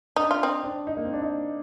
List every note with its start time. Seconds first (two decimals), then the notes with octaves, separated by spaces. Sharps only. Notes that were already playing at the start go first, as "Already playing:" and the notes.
0.16 D4 D#4
0.31 F4
0.43 C4 D#4
0.63 D4
0.87 D#4
0.97 A#3
1.05 C4
1.13 D4
1.22 D#4